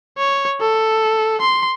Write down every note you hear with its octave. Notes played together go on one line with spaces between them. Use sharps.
C#5
A4
C6